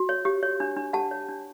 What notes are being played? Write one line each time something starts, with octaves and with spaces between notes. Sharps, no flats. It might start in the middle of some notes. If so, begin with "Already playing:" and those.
Already playing: F#4
C#5
G4
C#5
D4
D4
G4 F#5 A5
C#5
D4